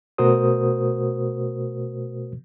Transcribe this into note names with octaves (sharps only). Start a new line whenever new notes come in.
B2 A3 F#4 A#4 C5 D#6